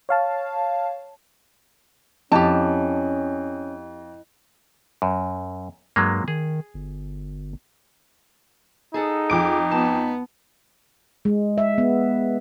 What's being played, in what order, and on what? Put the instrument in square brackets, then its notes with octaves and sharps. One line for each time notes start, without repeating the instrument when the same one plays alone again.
[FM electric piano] C#5 F5 A5
[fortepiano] F2 [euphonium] C#4 [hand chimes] E4 D#5 [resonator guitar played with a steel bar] G4 A5
[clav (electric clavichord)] F#2
[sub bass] G2 [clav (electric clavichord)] F#3 G#3 A#3
[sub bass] D#3 [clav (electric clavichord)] G#4
[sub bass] G1
[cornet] D#4 [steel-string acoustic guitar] G#4 A4 F#5
[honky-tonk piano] F2 D6 D7
[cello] B3 [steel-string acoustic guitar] A5
[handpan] G#3
E5
B3